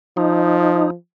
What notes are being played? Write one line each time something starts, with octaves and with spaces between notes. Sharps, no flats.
F3 D#4